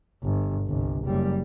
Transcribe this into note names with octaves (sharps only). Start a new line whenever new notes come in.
G1
G1 C2
F#1 G3